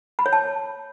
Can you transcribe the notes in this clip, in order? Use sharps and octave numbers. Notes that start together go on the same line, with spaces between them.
B5
C#5
A5